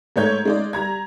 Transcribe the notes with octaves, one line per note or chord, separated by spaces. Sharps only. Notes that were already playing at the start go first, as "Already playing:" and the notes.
G#2 A3 C#5 G6 G#6
G#3 D#4 D5
G3 A#5 G#6